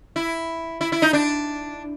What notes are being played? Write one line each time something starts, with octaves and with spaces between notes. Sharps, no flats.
E4
E4
E4
D#4
D4